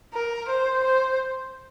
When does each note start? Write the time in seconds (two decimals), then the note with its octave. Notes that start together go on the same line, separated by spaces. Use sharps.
0.13 A#4
0.48 C5
0.84 C5